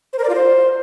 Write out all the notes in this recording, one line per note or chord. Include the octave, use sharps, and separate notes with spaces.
C5
A#4
D5
F4
C5